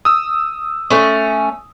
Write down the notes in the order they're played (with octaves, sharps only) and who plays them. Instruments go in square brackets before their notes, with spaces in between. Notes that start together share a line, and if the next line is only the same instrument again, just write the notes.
[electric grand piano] D#6 E6
[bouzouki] A3 C#4